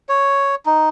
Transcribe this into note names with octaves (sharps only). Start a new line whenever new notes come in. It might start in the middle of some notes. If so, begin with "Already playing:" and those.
C#5
D#4